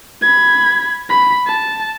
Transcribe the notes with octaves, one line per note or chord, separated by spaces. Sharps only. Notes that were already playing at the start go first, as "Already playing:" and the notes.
B5 G#6
B5
A5